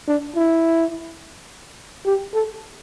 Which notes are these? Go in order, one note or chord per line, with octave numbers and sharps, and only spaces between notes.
D4
E4
G4
A4